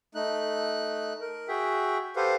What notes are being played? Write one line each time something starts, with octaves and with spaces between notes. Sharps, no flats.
A3 D#4 F#6
A#4
F#4 G#4 E5 G5
G4 A4 B4 C5 F5 F#5